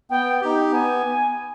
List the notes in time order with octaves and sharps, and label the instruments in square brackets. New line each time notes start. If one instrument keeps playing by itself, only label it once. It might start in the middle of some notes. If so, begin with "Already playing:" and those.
[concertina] B3 [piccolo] G5
[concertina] D#4 G4
[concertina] B3 [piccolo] G#5